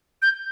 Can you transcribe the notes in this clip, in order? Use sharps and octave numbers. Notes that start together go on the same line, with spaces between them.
G6